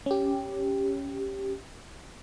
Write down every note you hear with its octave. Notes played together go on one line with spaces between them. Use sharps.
C#4 G4